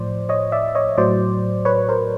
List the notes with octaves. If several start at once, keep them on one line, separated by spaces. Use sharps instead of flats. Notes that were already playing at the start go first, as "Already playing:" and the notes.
Already playing: A2 F3 C5 D5
C#5 D#5
D5 E5
C#5 D#5
A2 F#3 C5 D5
B4 C#5
A#4 C5